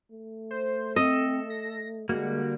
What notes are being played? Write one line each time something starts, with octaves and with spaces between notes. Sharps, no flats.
A3
C5
C4 A4 D#5
A#6
D3 G3 G#3 A#3 F#4